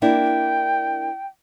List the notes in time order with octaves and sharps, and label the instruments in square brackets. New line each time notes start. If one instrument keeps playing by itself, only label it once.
[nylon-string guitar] A#3 D4 E4 [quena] G5